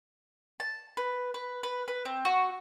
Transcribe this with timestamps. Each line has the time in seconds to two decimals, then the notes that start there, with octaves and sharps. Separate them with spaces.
0.60 A5
0.97 B4
1.34 B4
1.63 B4
1.88 B4
2.05 C4
2.25 F#4